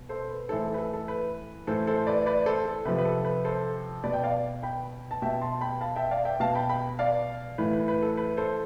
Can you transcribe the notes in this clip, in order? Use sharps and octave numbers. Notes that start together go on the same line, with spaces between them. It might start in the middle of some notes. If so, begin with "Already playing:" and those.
Already playing: B2
A4 C5
B4
A2 E3 A4 C5
A4
B4
A4
A4
B4
A2 E3 A4 C5
A4 C5
B4 D5
B4 D5
A4 C5
A4
C3 F3 B4
B4
A4
B4
A4 C5
B2 B4 D5
G5
D5 F5
G5 B5
A5
B2 E5 G5
A5 C6
G5 B5
F5 A5
E5 G5
D5 F5
E5 G5
B2 F5 A5
G5 B5
G5 B5
D5 F5
A2 E3 B4
B4
B4
A4
B4
A4 C5